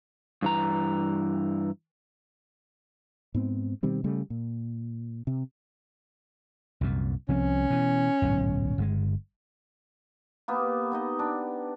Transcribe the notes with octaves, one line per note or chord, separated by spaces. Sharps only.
G2 E3 A#5
G#2 B3 C4
B2 D#3 G3 C4
C#3 G3 A3
A#2
C3
C2 F#2 A#2
C2 F3 C4 C#4
B2 E3
D1 B1 G#2
G1 C3 G#3
A#3 B3 G4
B3 D#4 D#5
D4